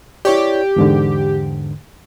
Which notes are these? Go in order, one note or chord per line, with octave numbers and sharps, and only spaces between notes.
E4 G4 C#5 D5
E2 G#2 D3